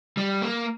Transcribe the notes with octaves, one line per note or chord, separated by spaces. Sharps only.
G3
A#3